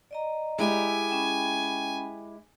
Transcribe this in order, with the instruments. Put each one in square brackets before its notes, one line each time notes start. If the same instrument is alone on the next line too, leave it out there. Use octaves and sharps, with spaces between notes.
[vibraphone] D5 D#5 A#5
[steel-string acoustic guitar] G#3 E4 G4 [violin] G#5
[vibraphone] C#4 G5 B5